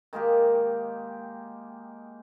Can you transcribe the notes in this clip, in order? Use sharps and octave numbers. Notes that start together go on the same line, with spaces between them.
D#3 G#3 A#3 G4